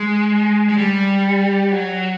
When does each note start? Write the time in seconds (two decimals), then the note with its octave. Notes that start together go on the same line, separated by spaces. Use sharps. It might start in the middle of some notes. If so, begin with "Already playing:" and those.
Already playing: G#3
0.69 G#3
0.78 G3
1.72 F#3